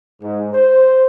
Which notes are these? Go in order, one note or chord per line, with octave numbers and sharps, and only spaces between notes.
G#2
C5